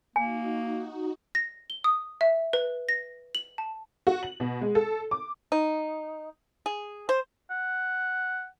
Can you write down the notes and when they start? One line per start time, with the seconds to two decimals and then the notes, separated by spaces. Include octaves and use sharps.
0.16 A#3 D#4 F#4 G#5
1.35 A#6
1.70 G7
1.84 D#6
2.21 E5
2.53 B4
2.89 A#6
3.35 F#7
3.58 A5
4.07 F#4
4.23 F#7
4.40 B2
4.61 G#3
4.75 A4
5.11 D6
5.52 D#4
6.66 G#4
7.09 C5
7.50 F#5